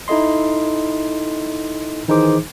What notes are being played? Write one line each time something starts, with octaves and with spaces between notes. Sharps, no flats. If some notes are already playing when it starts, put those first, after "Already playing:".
D#4 E4 A4 D#5 C6
D#3 E3 D#4 G#4 C5 D6